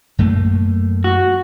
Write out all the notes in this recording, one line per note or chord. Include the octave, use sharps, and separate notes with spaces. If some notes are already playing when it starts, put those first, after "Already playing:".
F#2 A3 A#3
F#4